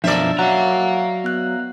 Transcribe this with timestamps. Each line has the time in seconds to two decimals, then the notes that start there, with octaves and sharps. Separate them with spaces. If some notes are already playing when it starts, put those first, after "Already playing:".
0.04 B1 F#2 F3 D4 A#4 D5 E5
0.39 F#3 F5 F#5 A#5 F#6
1.24 B3 F#6